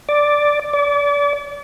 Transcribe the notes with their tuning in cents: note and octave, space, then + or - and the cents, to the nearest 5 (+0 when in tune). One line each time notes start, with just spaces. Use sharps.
D5 +0
D5 -35